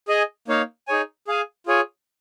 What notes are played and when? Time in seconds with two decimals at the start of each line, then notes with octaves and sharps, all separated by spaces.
0.08 G#4 D#5 G#5
0.48 A#3 D#4 C#5 F5
0.88 D#4 G#4 C#5 G#5
1.27 G#4 F5 G#5
1.66 F4 G#4 C#5 G#5